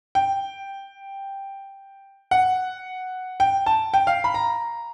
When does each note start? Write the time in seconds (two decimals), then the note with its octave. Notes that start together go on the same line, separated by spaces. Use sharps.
0.15 G5
2.31 F#5
3.40 G5
3.66 A5
3.94 G5
4.07 F5
4.24 B5
4.34 A#5